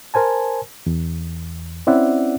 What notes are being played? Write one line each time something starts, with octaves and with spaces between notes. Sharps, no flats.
A#4 C5 G#5 A5
E2
C4 C#4 E4 D5 E5 F#5